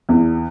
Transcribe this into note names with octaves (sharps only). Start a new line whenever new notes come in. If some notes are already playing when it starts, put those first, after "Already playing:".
E2